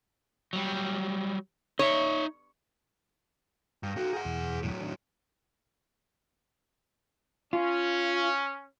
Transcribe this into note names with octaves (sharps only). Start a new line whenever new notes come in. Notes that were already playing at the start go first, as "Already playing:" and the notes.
F#3 G3
D#4 C#5 E5
G2 F5 G5 A#5
F#4 A4
G#4 F#5
E2 B2 E3
A2 F#3
D#3 D4
C#4 F4